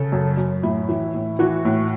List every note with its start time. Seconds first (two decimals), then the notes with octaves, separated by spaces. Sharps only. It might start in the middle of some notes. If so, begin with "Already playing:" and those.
Already playing: C#3 A4
0.12 F#2
0.37 F#2
0.63 A2 E4
0.89 E3
1.14 A2
1.39 E3 F#4
1.65 A2